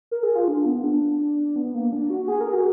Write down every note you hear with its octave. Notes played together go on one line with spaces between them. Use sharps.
A#4
G#4
F4
D4
B3
D4
B3
A#3
D4
F#4
G#4
A#4
G#4
F#4